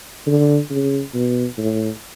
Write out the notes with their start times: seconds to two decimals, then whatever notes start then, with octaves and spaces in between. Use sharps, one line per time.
0.27 D3
0.70 C#3
1.15 B2
1.58 A2